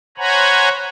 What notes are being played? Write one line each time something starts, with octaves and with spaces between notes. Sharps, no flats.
C5 C#5 F#5 G#5 A#5 B5